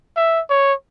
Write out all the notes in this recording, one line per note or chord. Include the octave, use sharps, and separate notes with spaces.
E5
C#5